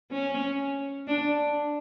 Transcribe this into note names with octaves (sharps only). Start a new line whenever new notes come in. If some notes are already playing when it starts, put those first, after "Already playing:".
C#4
D4